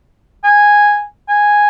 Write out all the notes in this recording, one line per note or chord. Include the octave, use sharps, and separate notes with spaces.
G#5
G#5